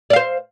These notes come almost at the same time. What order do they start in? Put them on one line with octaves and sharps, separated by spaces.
D5 F5 C5